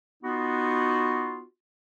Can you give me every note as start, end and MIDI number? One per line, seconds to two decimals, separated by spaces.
0.23 1.45 59
0.23 1.45 63
0.23 1.45 65
0.23 1.45 66